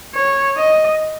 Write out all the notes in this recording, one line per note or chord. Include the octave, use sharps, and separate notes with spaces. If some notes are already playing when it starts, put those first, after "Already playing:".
C#5
D#5